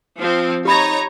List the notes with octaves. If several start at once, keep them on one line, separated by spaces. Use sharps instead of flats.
F3 C4
D#4 G4 C#5 A#5 B5